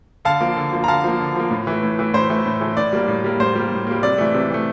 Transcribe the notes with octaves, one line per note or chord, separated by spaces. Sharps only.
D3 F5 A5
F3 A#3
D3
F3 A#3
A#5
D3 F5 A5
F3 A#3
D3
F3 A#3
A2
E3 A3
A2
E3 A3
A2 C5
E3 A3
A2
E3 A3
A2 D5
G3 A#3
A2
G3 A#3
A2 C5
G3 A#3
A2
G3 A#3
C3 D5
E3 A3
C3
E3 A3